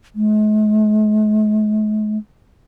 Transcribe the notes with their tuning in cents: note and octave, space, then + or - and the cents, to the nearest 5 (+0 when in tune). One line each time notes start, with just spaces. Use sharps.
G#3 +45